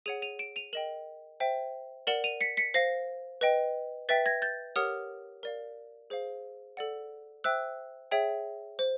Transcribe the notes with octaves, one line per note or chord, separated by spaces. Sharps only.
G#4 C#5 F#5 D#7 F7
D#7 F7
D7 E7
D#7 F7
A#4 D#5 G5 E7 F#7
C5 E5 G5
A#4 D5 F#5 E7 F#7
D#7 F7
B6 C#7
B6 C#7
C5 F5 A#6 C7
B4 D#5 G5
B4 E5 G5 A6 B6
G#6 A#6
G6 A6
G4 A#4 C#5 F#5 D#6 F6
A#4 D5 F5
G#4 C5 F5
A4 D5 F#5
C5 E5 G5 E6 F#6
G#4 C#5 E5 G5
C5